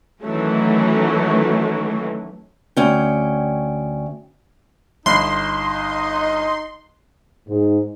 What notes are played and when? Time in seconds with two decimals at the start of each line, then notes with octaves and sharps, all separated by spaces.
0.22 D#3 E3 F#3 A3 C#4
2.77 D2 C#4 G5
5.06 G1 D#4 D#5 B5 C6 C7
7.48 G#2